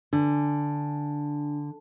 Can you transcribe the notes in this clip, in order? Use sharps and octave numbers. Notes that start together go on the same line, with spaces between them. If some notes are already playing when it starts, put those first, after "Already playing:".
D3 D4